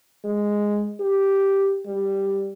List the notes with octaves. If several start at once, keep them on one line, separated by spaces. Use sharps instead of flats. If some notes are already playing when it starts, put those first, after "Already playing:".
G#3
G4
G3